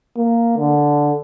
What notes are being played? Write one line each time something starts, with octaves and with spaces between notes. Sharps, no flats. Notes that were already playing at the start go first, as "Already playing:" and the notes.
A#3
D3